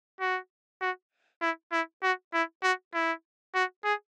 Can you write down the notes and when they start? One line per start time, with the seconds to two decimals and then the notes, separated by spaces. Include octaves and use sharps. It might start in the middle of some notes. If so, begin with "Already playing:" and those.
0.20 F#4
0.82 F#4
1.42 E4
1.72 E4
2.03 F#4
2.34 E4
2.63 F#4
2.94 E4
3.55 F#4
3.85 G#4